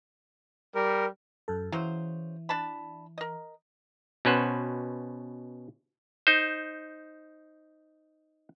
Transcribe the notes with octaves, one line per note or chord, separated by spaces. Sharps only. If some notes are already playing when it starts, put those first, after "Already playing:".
G3 A#4
F#2 A4
C#3 E3 F#3 C5
D4 A5 B5
A#4 D#5
B2 C#4 B4 C5 F#5
D#4 C5